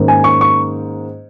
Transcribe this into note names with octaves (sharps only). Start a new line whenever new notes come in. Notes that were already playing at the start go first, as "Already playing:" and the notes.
Already playing: G#2 D#3 A#3 C#4
G#5
C#6
C#6